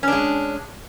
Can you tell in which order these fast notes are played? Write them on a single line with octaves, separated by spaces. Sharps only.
C#4 D4 G#3